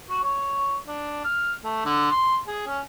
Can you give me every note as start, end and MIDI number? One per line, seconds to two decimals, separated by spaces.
0.10 0.21 66
0.23 0.76 73
0.87 1.24 62
1.24 1.53 89
1.64 1.81 57
1.85 2.10 50
2.11 2.36 84
2.47 2.65 68
2.67 2.80 61